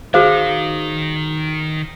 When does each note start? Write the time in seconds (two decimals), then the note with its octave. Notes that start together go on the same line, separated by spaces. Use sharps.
0.14 D#3 F#4 G#4 C5 F5